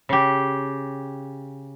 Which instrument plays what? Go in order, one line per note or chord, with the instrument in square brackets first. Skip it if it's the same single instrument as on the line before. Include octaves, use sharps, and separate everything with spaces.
[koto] C#3 G4